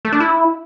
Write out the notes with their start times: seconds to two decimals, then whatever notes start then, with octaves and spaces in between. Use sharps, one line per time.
0.05 A3
0.12 D4
0.20 E4